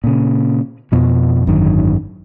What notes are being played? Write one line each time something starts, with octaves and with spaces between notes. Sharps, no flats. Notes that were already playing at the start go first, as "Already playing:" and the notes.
A#2 C#3
F2 B2 F3
G#1 F#2 D3 D#3